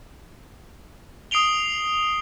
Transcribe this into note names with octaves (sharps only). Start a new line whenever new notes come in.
D#6 C7 D7 F7 G7